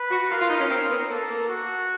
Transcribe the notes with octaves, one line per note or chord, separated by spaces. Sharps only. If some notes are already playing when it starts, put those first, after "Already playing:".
Already playing: B4
F#4
F4 A#4
F4
D#4
C#4
C4
B3
A#3 A4
A#3
F#4